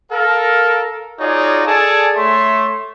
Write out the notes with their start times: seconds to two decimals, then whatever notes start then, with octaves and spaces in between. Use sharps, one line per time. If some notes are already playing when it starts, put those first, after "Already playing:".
0.12 A4 A#4 F5
1.20 D#4 F4 F#4 G#4 C#5 D5
1.67 G#4 A4 D5 G#5 A5
2.16 A3 C#5 E5 C6